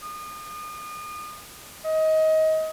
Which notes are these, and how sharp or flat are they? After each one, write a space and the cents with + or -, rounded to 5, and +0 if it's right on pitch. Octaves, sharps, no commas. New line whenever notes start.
D#6 -35
D#5 +25